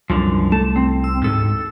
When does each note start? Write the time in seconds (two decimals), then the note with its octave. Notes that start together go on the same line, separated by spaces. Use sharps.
0.10 C2 F#2 D3 F3
0.52 A3 A5
0.76 C4
1.04 E6
1.24 D2 G#2 G#3 A4 E6